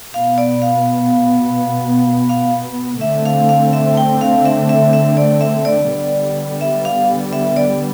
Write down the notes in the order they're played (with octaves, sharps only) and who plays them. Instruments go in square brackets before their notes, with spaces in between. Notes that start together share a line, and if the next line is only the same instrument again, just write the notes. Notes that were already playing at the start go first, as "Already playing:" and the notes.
[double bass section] B2 B3 [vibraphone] F5
[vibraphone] D5
F5
F5
[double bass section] D3 A3 C4 [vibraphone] E5
[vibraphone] F5
F5
E5
G5
F5
E5
E5
E5
D5
E5
D5
[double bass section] D3 G3 B3
[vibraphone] E5
F5
E5
D5